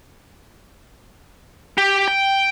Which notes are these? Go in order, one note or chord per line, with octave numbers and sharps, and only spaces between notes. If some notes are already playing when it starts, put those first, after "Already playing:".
G4
G5